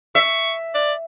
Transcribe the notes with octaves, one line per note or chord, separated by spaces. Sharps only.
E5 C#6
D5